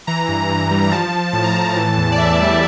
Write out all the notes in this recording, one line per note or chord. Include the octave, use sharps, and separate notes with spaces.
E3 A#5
G2
G2
G3
A#5
F3 A5
F3
A2 A5
A#5
A2 A5
E3
E2
D5
E2 E5
G3